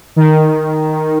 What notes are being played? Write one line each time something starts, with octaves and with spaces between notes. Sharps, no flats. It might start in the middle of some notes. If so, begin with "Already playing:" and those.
D#3